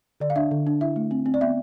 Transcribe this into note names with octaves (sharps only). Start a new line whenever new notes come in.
D3 D5
F5
D4 E5
D3
D4
E4 E5
A3
C4
C4
D5
B3 E5